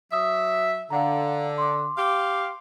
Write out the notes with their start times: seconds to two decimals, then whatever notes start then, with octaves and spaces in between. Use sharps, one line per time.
0.12 F#3 E5 D#6
0.90 D3 F5 F#5 A#5
1.58 C6 D6
1.98 G4 F5